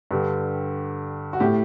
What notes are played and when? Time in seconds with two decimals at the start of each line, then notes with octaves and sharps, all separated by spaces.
0.11 G2 D3 G4
1.33 F#4
1.40 A2 G4